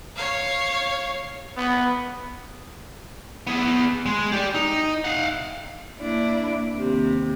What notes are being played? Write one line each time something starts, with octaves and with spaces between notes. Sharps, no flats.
C#5 F5
B3
B3 G#4
G#3
G4 D5
D#4
F5 F#5
A#3 D4 E4
D#2 C3